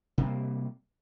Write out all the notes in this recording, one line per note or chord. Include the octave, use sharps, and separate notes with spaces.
C3 G3 A#3